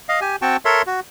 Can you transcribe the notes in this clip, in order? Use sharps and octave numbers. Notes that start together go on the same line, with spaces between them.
D#5 F5
G4 G#5
C4 F#4 G5 A5 C#6
A4 A#4 C#5 E5 C6
F#4